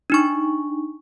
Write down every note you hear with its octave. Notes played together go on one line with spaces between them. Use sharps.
D4 D#4 C#6